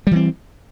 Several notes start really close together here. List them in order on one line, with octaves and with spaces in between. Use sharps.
G3 E3 C4